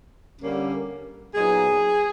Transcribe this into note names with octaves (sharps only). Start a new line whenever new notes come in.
D3 G3 A#3 C#4
A#2 F#3 B3 D#4 G#4